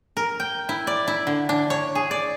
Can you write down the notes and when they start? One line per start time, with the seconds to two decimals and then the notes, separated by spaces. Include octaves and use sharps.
0.17 A#4
0.40 G5
0.69 E4
0.87 D5
1.08 E4
1.27 D3
1.49 D4
1.70 C#5
1.95 G#4
2.11 D5